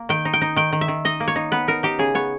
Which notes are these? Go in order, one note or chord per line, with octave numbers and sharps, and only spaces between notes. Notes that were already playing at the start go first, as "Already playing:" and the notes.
Already playing: A#3
D#3 G5
D#4
G5
D#4
D#3 G5
D#3
E5
D#3
D#4 D#5
A#3
C#5
D#4
B3 B4
D#4 A#4
D#4 G4
C#3 G#4
B3 C#5